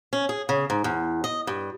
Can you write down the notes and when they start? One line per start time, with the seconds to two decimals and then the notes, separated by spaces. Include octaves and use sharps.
0.13 C#4
0.29 G#4
0.49 C#3
0.70 G#2
0.84 E2
1.24 D#5
1.47 G2